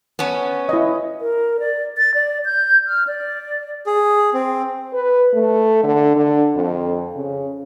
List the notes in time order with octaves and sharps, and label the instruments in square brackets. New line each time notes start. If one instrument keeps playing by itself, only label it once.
[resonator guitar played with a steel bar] B3 C#4
[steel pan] E4 D#5
[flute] A#4
D5
A6
D5
G6
F6
D5
[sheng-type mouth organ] G#4
C4
[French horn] B4
A3
D3
D3
F2
C#3